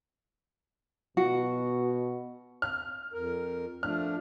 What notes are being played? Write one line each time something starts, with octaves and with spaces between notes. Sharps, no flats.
B2 F#4
F6
F2 A#4
F3 A3 D4 F6